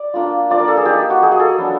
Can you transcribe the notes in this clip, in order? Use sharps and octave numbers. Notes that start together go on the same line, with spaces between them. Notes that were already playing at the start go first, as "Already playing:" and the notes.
Already playing: D5
A#3 D4 F4
A#3 D4 F4 D5
A#4
A4
G#4
A#3 D#4 G4
F#4
A#3 D#4 G#4
G#4
A4
F#3 B3 D4